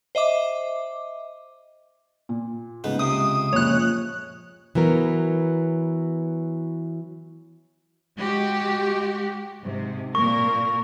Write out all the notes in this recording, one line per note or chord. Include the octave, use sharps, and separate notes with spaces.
C5 D#5 E5 D6
A#2
G#2 C#3 B3
C#2 C3 D#6
F#1 A#2 F3 C#5 F#6
E3 F#3 B3 A#4
G#3 F#4 G4
G#2 C3
A#2 A#4 C#6